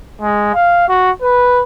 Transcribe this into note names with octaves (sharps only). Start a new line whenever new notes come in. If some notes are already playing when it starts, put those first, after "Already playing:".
G#3
F5
F#4
B4